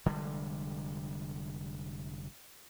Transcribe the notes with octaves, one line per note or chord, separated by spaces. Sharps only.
F1 D3 G3 G#3